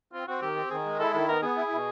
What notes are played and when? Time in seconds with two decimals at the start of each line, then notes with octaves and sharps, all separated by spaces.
0.13 C4 F4
0.28 C4 F#4
0.42 D#3 G4
0.56 C4
0.70 D#3 G#4
0.85 G#3
0.99 E4 A4
1.13 D#3 A4
1.28 B3 A#4
1.42 B3 G#4
1.56 E4
1.71 B2